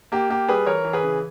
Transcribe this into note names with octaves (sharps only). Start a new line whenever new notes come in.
A#3 G4
A#3 G4
G3 G#4 B4
E3 A#4 C#5
E3
G#4 B4
C#3